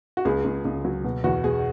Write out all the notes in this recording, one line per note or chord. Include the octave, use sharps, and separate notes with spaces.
F#4
C#2 G#4
C#2
C#2
F#3
B2
E2 F#4
B2 G#4